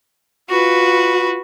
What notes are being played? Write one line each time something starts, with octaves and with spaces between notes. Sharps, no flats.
F4 F#4 B4